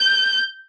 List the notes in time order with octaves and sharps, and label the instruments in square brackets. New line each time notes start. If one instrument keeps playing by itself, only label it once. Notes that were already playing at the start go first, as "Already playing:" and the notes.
Already playing: [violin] G6